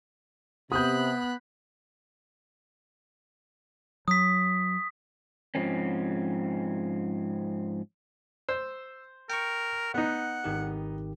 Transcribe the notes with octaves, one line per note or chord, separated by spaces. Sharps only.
C3 B3 B5 D#6 F#6 G6
F#3 D#6 B6
G#2 F3 C4 C#4
C5 E6
A#4 G5 C#6
B3 D#4 F#5
G#1 D#3 G4